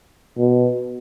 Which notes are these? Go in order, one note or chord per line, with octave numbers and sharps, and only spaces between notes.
B2